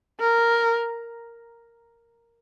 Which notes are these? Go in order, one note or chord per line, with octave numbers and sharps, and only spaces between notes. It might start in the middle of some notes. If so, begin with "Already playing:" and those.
A#4